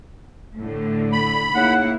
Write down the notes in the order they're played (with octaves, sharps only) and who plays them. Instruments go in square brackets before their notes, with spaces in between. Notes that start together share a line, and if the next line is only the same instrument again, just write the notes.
[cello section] A2 D3
[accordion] B5
[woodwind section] C#3 D#4 F#5 [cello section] A#3 E4